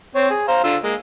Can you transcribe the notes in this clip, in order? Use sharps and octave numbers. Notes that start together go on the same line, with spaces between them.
C4 C#5
G#4
C5 F5 A#5
D3 F4 E6
G#3 A#3